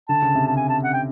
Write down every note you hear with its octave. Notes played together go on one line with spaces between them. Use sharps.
D3 A5
C#3
C3
C#3 A5
G#5
A5
F#5
G5